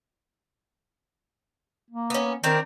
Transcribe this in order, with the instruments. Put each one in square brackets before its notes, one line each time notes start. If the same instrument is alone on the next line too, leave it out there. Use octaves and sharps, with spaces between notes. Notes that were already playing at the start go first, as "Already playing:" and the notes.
[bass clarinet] A#3
[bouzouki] B3 C#4
[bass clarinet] D#3 [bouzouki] C4 D4 A#4